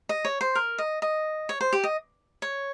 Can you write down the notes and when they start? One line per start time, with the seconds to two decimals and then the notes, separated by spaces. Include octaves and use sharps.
0.09 D#5
0.25 C#5
0.41 C5
0.55 A#4
0.79 D#5
1.02 D#5
1.49 C#5
1.61 C5
1.73 G4
1.84 D#5
2.42 C#5